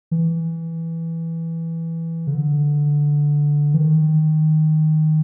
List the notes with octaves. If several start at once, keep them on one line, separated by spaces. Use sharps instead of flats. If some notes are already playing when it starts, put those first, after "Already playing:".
E3
C#3
D3
E3
D#3